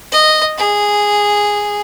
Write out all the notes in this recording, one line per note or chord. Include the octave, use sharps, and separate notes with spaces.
D#5
G#4